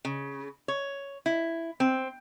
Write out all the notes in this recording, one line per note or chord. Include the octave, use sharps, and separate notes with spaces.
C#3
C#5
E4
C4